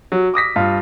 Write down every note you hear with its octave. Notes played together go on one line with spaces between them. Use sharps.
F#3
D6 D#6 A#6 B6
G2 F4